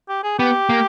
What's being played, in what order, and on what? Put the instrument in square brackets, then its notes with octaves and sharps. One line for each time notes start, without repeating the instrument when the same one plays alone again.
[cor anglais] G4
G#4
[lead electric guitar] B3 [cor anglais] G4
[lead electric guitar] A#3